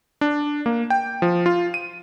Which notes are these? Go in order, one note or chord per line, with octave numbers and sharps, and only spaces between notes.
D4
A#3
G5
F3
F4
D#7